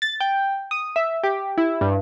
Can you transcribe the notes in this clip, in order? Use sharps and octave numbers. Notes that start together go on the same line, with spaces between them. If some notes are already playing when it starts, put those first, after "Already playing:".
A6
G5
D#6
E5
G4
E4
G2